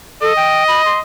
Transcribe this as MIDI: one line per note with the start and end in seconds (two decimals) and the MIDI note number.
0.22 0.33 69
0.22 1.00 75
0.36 0.64 79
0.68 0.84 83
0.85 0.99 84